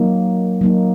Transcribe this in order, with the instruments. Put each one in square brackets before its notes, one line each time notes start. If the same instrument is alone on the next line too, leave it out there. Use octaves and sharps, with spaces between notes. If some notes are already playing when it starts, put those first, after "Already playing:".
Already playing: [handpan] F#3 A#3 D#4
F#3 A#3 D#4